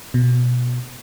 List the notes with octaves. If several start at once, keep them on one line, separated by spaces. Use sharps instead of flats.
B2